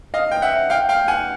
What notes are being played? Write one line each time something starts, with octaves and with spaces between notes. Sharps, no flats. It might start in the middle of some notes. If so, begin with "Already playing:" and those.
D#5 F5
G5
E5 F#5
F5 G5
F5 G5
F#5 G#5